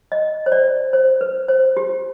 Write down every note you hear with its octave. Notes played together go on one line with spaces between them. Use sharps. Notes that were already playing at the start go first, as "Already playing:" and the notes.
D#5
C5
D5
C5
B4
C5
G4